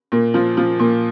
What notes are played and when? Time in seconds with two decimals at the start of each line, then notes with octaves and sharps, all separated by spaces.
0.12 A#2
0.34 F3
0.57 F3
0.79 A#2